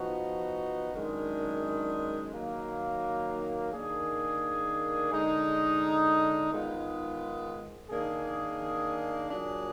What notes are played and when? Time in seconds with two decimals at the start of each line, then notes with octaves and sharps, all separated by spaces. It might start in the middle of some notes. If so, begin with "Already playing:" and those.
Already playing: F3 B3 D#4 F#4
0.93 F#2 D#3 G#3 D4
2.33 D#3 F#3 A#3
3.72 D#3 A#3 D4 G#4
5.11 D3 G#3 D#4
6.50 G#2 D#3 G#3 B3 F4
7.89 D#3 A#3 D4 G#4
9.29 A#2 F#3 D4 G#4